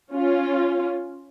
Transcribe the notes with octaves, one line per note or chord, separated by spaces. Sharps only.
C#4 F4